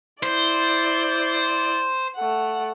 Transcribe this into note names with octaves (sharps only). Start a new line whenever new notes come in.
E4 C5 D5
A3 F#5